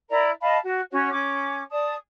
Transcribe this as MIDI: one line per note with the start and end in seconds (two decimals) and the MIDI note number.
0.10 0.30 64
0.10 0.30 70
0.10 0.30 74
0.10 0.30 82
0.41 0.57 75
0.41 0.57 77
0.41 0.57 81
0.41 0.57 83
0.64 0.82 66
0.92 1.08 61
0.92 1.08 66
0.92 1.08 73
1.10 1.62 61
1.10 1.62 86
1.70 1.94 74
1.70 1.94 81
1.70 1.94 87